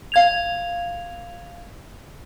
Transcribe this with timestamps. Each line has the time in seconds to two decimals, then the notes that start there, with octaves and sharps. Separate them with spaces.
0.12 F5 G#6 F7